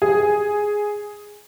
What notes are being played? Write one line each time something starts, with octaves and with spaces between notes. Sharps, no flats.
G#4